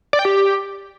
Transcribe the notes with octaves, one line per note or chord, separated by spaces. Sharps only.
D5
G5
G4